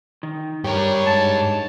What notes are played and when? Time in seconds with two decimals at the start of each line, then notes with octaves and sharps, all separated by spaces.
0.23 D#3
0.64 G2 G3 G4 A#4 C#5
1.05 G#2 A5